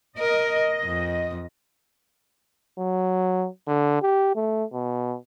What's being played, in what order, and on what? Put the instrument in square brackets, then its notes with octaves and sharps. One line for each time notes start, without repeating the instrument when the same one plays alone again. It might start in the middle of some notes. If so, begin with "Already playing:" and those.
[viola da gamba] A#4 [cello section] D#5
[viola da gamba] F2
[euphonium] F#3
D3
G4
A3
B2